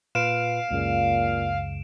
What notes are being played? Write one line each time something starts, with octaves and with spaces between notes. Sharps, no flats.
A#2 F4 B4 F5 D7 E7
C#2 F#2 A#2 C#3